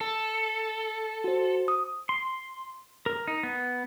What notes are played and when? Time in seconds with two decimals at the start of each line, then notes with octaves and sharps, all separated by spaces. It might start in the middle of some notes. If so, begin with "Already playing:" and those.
0.01 A4
1.24 F#4 C5
1.68 D#6
2.09 C6
3.06 A#4
3.27 D#4
3.43 B3